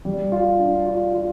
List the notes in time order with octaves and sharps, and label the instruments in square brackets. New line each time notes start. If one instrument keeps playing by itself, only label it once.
[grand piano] G3
F4
D4
F4
F4